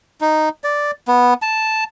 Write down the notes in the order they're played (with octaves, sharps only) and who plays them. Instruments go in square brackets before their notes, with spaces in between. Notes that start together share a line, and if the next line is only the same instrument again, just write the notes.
[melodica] D#4
D5
B3
A5